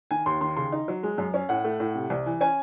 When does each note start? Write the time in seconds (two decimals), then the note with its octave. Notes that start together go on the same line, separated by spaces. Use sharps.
0.11 D#3 G#5
0.26 D#2 C6
0.41 D#3 C6
0.57 C#3 C6
0.72 D#4
0.88 F#3
1.03 G#3
1.18 F#2
1.34 C#4
1.49 A2 F#5
1.65 A3
1.80 A2
1.95 C3
2.10 C2
2.26 E3
2.41 C#4 G#5